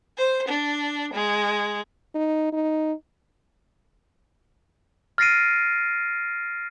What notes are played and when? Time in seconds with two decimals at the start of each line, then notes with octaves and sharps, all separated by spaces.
0.17 C5
0.48 D4
1.14 G#3
2.15 D#4
2.52 D#4
5.18 F6 A6 A#6 C7 D7 D#7